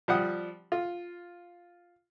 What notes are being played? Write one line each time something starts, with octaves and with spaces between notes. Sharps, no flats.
F3 G3 F#5 D#6
F4